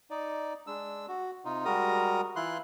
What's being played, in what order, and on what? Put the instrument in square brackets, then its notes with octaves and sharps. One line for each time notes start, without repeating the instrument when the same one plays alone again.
[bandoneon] D#4 D5
G#3 D4 E6
F#4
C3 D#4 F4
G3 G#3 F#4 A#4 A#5 D#6
E3 E4 F4 C6 F#6